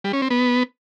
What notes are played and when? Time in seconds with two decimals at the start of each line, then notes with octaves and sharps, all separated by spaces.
0.04 G3
0.13 C#4
0.22 C4
0.30 B3